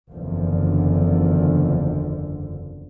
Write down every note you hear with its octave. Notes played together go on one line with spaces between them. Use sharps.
F#1 E2 D3 F3